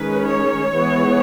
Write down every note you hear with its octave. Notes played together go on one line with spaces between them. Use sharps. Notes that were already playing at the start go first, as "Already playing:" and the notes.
Already playing: D#3 G#3 C#4 B4
C#5
E3 G#3 B3